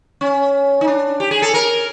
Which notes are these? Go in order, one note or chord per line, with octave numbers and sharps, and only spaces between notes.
C#4
D#4
D4
G4
G#4
A4
A#4